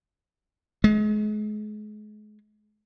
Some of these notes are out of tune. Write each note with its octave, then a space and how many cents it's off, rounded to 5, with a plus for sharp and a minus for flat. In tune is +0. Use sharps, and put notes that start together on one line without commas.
G#3 +35